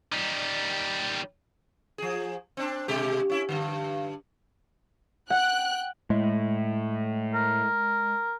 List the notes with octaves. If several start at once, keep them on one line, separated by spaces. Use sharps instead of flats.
D#3 G3
F3 G#4
C4 D4
B2 G#3 G4
C#4 E4
G2 D3
F#5 G5 F#6
A2 G#3
A#4